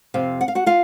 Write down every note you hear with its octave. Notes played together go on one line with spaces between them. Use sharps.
F2 C3 F5
F#5
F5
F#4 F#5
F4 F5